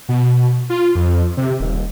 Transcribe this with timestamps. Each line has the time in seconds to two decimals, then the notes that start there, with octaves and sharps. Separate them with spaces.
0.09 B2
0.70 F4
0.95 F2
1.37 C3
1.60 D#1